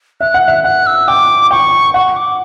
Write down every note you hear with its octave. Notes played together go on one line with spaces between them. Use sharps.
E5 F#6
F#5
F#6
E5
F#5 F#6
E6
G5 D6
G5 C#6
F#5 C#6
D6